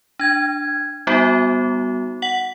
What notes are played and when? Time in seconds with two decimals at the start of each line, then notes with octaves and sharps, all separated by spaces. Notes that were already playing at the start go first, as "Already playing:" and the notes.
0.19 D4 G#6
1.07 G3 B3 D#4 F#4
2.22 F#5 F#7